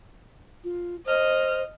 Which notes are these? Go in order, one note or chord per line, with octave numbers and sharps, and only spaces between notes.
F4
C5 D#5 F6